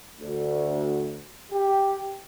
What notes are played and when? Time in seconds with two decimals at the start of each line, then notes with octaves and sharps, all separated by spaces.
0.20 D2
1.52 G4